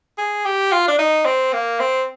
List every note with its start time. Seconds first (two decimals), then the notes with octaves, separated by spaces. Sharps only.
0.17 G#4
0.45 G4
0.72 F4
0.87 D4
0.98 D#4
1.25 C4
1.53 A#3
1.79 C4